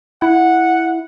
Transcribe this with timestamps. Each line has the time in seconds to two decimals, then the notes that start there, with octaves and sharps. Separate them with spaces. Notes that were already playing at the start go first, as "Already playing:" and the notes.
0.22 E4 F#5